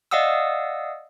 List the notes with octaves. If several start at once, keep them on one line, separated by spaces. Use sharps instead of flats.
D5 D#5 F5 F#5 D#6 E6